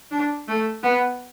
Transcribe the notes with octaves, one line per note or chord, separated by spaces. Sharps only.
D4
A3
B3